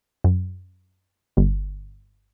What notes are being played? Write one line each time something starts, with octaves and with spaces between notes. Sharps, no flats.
F#2
G1